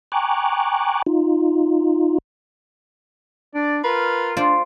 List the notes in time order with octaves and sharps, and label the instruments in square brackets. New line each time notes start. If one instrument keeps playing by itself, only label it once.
[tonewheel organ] G5 G#5 A#5 C#6 D6 F#6
D#4 F4
[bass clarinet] D4 [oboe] D5
[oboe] F4 [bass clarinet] A#4 [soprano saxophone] B4
[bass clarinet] D4 [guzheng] F4 C5 D5